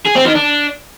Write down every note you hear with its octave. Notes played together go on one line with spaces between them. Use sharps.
G#4
C4
D#3
D4